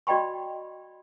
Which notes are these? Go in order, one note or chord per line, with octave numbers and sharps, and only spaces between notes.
F#4 D5 D#5 G5 B5 C#6